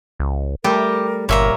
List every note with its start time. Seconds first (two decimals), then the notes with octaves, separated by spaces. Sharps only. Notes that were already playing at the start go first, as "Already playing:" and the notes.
0.20 C#2
0.64 G3 A3 G4 A#4
1.29 G1 A#2 A#4 C#5 E5 A#5